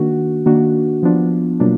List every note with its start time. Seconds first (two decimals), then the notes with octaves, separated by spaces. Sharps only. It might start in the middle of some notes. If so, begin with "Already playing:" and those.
Already playing: D#3 A#3 D4 F#4
0.46 D#3 A#3 D4 F#4
1.03 F3 B3 D4 F4
1.60 B2 F#3 A#3 D4 F4